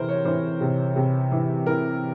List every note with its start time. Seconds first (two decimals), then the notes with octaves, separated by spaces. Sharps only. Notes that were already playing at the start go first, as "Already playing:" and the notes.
Already playing: C3 E3 A#4 C5
0.09 C#5
0.25 E3 C5
0.61 C3
0.96 C3
1.32 E3
1.66 E3 A#4